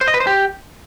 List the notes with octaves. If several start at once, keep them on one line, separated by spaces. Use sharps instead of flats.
C5
D#5
B4
C5
G4